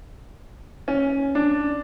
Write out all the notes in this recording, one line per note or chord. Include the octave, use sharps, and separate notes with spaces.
C#4
D4